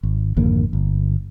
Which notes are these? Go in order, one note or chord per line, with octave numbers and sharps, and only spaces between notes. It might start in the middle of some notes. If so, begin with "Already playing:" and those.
G#1
G#1 F2 D3 A#3
G1